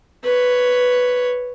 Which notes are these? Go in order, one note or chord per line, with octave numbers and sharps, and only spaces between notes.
B4 C#5